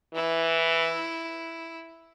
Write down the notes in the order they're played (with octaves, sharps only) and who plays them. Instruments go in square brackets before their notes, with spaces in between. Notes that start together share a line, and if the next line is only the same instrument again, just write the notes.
[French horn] E3 [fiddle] E4